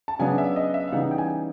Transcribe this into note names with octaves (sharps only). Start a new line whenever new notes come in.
A5
C#3 F#3 B3 D4 G#5
E5
D#5
E5
F5
C#3 E3 G3 B3 D#4 F#5
G5
G#5
G5